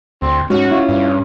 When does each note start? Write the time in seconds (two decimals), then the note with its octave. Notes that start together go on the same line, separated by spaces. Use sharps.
0.22 D2 C4
0.50 G#2 C#4 F#4
0.71 E4 F4
0.89 G2